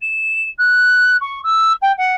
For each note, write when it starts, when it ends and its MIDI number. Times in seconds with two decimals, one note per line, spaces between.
0.01 0.48 100
0.58 1.16 90
1.21 1.39 85
1.43 1.72 88
1.82 1.92 79
1.97 2.15 78